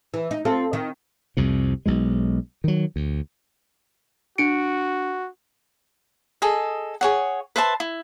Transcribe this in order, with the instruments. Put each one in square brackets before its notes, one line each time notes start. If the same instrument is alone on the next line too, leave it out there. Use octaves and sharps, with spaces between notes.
[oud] E3
D#4
C4 F4 A4
D#3
[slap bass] C2 F2 C3
B1 B2 G#3
D#3 F#3
D2
[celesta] D4 C#7 D7 [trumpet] F#4
[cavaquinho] G#4 A4 D#5
G#4 C#5 F#5
B4 C5 E5 A5
E4